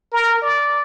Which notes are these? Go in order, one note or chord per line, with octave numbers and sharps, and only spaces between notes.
A#4
D5